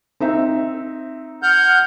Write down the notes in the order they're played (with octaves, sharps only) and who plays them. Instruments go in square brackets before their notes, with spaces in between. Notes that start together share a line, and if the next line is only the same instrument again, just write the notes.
[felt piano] C4 D#4 E5
[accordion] F#5 F6 G6